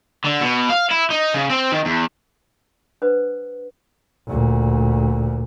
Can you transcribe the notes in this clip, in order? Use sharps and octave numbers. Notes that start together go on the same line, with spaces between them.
D3
B2
F5
E4
D#4
C#3
C4
D#3
E2
D4 B4 C5 F#5 D#6
D2 A#2